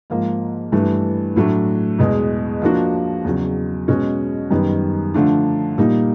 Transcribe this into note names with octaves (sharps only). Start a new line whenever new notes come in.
G#2 F3 A#3
G2 E3 A3 D4
A2 F#3 A3 D4
E2 B2 G#3
F3 A#3 D4 F#4
E2 C#3 F#3
B2 G#3 C#4 F#4
F#2 D#3 G3 B3
D3 F3 A3 D4
A#2 G3 A#3 D#4